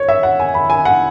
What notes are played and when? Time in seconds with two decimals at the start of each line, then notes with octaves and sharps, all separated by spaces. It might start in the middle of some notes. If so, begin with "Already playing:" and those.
Already playing: C#5
0.08 E5
0.23 F#5
0.40 G#5
0.54 B5
0.70 G#5
0.85 F#5